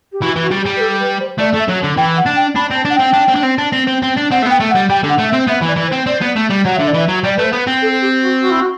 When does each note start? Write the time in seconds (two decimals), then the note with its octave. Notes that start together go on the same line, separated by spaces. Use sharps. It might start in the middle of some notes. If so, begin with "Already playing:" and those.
0.12 G4
0.21 E3 F#4
0.36 E3 F#4
0.51 G3
0.61 G4
0.66 G3
0.76 B4
0.80 A4
1.00 B4
1.19 C5
1.38 A3 D5
1.53 A3
1.59 E5
1.68 F#3
1.77 A5
1.83 D3
1.97 E3 G5
2.16 F#5
2.26 D4
2.36 G5
2.55 D4 B5
2.71 C4 A5
2.85 D4 F#5
2.95 C4 G5
3.14 D4
3.29 C4
3.36 D4
3.43 C4
3.58 D4
3.72 C4
3.87 C4
4.02 C4
4.17 D4
4.31 C4 F#5
4.42 A3
4.46 B3 G5
4.60 A3
4.70 F#5
4.75 G3
4.89 G3 G5
5.04 D3 F#5
5.19 A3
5.28 E5
5.33 C4
5.48 B3 E5
5.62 E3
5.67 D5
5.77 E3
5.87 C5
5.92 C4
6.06 C4 D5
6.21 B3
6.36 A3
6.50 G3
6.64 F#3 F#5
6.76 D3 E5
6.87 D5
6.94 E3 E5
7.08 F#3
7.23 G3 D5
7.36 A3 B4
7.43 C5
7.53 B3
7.67 C4
7.81 A4
8.01 G4
8.21 F#4
8.40 F#4
8.50 E4
8.59 F#4